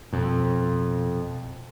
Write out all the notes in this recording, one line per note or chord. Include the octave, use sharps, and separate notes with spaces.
F2 B2